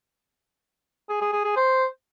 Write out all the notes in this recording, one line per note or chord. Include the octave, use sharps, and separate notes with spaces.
G#4
G#4
G#4
G#4
C5